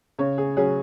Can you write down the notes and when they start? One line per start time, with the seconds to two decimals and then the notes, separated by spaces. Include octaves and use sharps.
0.19 C#3 C#5
0.38 G#4
0.57 F#3 C#4 G#4